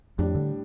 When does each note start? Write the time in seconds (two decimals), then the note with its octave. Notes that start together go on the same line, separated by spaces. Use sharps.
0.19 F2 A2 G3 D4
0.35 D3